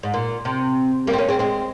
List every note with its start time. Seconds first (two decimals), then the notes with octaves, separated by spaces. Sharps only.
0.03 G#2
0.14 A#2
0.45 C3
1.07 G3 A#3
1.13 C4
1.18 A#3 C#4
1.28 G#3 C4
1.39 G#3 C4